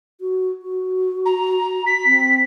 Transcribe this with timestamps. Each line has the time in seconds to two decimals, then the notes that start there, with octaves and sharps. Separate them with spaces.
0.21 F#4
0.62 F#4
1.25 A#5
1.86 B6
2.06 C4